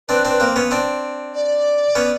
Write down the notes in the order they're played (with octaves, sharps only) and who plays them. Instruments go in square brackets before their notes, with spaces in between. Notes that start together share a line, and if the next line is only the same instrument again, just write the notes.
[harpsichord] C4 D4 [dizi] B4
[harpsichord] C4 D4
[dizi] B4
[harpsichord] A#3 C4
B3 C#4
C4 D4
[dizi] D5
[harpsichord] B3 C#4